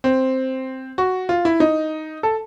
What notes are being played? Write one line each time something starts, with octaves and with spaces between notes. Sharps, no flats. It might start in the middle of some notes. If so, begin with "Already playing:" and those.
C4
F#4
F4
E4
D#4
A4